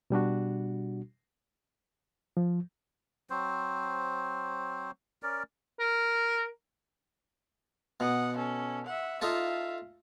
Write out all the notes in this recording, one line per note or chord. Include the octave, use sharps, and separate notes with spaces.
B2 G3 D4 F#4
F3
F#3 C4 C5
C#4 A#4 D5
A#4
B2 F#5 D#6
C#4 A4
E5 F#5
D#4 F4 A4 E5 F5